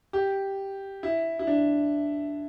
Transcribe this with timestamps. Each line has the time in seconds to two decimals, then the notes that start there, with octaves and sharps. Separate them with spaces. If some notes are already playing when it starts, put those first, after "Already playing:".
0.13 G4
1.03 E4
1.39 E4
1.47 D4